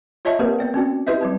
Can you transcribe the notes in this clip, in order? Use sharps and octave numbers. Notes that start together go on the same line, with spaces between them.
F4 C#5 D#5 E5 A5 C#6
A#3 C4 G4 A#4 B4
B3 D5 G5
C4 C#4 F#4 D5
E4 G4 B4 D#5 E5
G3 C4 A5